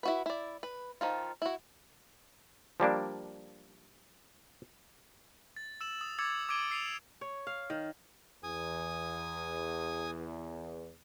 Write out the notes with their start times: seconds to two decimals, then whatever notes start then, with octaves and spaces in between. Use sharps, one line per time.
0.03 E4 F#4 B4
0.26 E4 D5
0.63 B4
1.01 D#3 F3 F4
1.42 E4 F#4
2.80 F3 G3 A#3 D4
5.56 A6
5.81 E6 E7 F#7
6.01 D#6
6.19 D6 E6 G#6 A6 C#7 F#7
6.49 D6 D#6 G#6 D7 D#7 G7
6.71 E6 C7 D7 D#7 F7
7.21 C#5
7.47 F5
7.70 D#3
8.43 E2 G#5 D#6